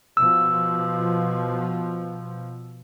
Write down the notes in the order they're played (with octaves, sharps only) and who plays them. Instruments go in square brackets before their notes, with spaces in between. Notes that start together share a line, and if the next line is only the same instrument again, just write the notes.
[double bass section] B2 F3 [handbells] E6